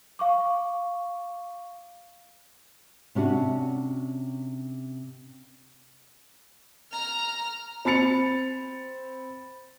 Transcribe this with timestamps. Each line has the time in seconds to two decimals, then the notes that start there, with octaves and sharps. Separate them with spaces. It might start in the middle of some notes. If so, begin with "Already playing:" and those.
0.19 F5 C#6 D6
3.15 C3 C#4 D4 F#4
6.92 A#5 F6
7.85 C4 B5 A6 C#7 F7